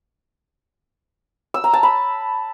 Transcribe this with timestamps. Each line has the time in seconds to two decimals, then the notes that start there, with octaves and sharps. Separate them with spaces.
1.54 E6
1.64 A#5
1.73 A5
1.83 B5